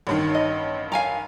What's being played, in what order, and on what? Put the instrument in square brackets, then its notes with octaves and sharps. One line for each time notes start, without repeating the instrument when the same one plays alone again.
[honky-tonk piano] A1 G2 D#3
[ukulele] D#5
F5 G#5 A#5